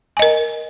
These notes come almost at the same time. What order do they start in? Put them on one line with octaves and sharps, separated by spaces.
G#5 D#5 A#4